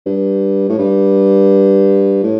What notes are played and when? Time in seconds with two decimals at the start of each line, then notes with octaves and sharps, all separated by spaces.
0.06 G2
0.69 A2
0.79 G2
2.23 A2